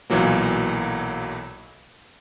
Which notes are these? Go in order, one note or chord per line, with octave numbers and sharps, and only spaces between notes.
B1 A#2 E3 F#3 A#3